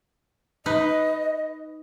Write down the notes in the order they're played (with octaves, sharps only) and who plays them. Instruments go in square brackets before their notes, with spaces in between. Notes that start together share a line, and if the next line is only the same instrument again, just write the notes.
[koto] D#4 B4 [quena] D#5